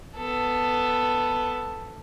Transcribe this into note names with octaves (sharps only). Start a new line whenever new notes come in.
B3 A4